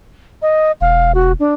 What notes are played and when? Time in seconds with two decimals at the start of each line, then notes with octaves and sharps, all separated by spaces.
0.42 D#5
0.81 E1 F5
1.15 F#4
1.40 D4